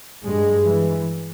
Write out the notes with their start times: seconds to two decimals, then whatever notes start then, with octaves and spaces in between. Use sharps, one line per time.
0.23 G2 G#3
0.65 E3